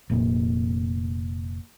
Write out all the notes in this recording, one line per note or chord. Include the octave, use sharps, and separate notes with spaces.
F1 A#2